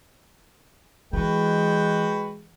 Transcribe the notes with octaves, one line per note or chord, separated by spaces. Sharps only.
E3 G#3 F#4 B4 G5